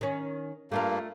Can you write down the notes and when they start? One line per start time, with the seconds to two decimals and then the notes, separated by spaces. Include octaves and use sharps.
0.01 D#3 C#4
0.72 G2 A3 A#3 F4 A#4